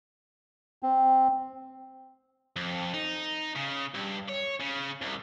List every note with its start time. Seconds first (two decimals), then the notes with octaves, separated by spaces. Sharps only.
0.83 C4
2.56 F2
2.94 D#4
3.55 C#3
3.94 G2
4.28 C#5
4.60 C#3
5.02 C2